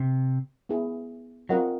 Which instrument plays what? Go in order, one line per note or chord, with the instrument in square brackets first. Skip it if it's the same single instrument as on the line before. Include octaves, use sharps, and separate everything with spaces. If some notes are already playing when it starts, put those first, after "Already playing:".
Already playing: [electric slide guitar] C3
[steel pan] B3 E4 G#4
[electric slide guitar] F#3 [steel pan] C4 F4 A#4 D#5 F#5